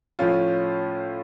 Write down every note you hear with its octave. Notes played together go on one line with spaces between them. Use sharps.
A2 F3 C#4 F4